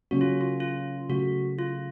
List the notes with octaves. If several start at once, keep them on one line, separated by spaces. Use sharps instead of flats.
C#3 F#3 A#3 C#4 F#4
F4
F4
F4
C#3 F#3 A3 F#4
F4